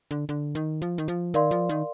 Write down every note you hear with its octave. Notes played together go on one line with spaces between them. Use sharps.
D3
D3
D#3
F3
D#3
F3
D#3 A#4 D5 F5 C6
F3
D#3